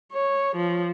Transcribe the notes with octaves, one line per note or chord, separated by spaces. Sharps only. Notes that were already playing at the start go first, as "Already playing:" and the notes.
C#5
F3